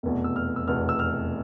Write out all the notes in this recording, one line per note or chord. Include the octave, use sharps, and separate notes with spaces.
F1 E2 B2
E6
F6
E6
F1 E2 B2 F6
E6
F6